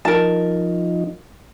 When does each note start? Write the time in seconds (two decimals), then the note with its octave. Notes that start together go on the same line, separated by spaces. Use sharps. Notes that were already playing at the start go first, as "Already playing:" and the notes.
0.05 F3 D#4 A#4 A5